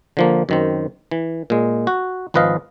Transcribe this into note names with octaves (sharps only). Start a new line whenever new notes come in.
D3 F3 A#3
F#2 D#3 C4
E3
A#2 G#3
F#4
G#1 F3 B4 D#5 F5